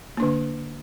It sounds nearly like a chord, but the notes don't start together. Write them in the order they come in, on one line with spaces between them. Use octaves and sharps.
A#3 D4 D3